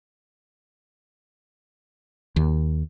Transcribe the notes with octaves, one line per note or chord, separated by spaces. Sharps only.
D#2